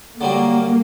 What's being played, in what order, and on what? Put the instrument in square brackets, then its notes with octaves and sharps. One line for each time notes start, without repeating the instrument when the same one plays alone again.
[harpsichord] D3 F#3 G3 [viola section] A#3